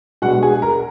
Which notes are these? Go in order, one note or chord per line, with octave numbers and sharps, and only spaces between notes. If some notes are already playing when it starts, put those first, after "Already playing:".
B2 G#3 B3 D4 F#4 F#5
G#4 G#5
A#4 A#5